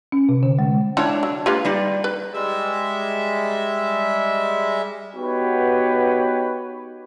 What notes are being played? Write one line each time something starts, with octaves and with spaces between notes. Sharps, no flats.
C#4
C3
D3
G#3
E3 D4 F4 C#5
F#3
A#3 F4 G4 B4 F5
G3 D#4 D5
B4
G3 G#3 E5
B3 D#4 F#4 G4 B4 C#5